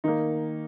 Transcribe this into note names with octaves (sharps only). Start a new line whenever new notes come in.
D#3 A#3 D#4